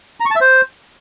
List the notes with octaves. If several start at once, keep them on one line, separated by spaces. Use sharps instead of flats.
A#5
C#6
A5
E5
C5